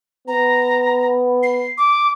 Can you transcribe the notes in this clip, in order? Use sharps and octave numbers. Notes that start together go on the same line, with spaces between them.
B3 A#5
C7
D6